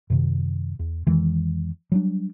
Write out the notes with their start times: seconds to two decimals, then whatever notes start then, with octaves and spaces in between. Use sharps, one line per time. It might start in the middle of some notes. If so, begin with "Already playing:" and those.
0.10 F#2 C3 D#3
0.79 E2
1.07 F2 D#3 E3 G#3
1.92 F#3 G3 D4